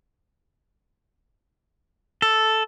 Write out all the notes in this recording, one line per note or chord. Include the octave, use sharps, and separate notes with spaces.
A4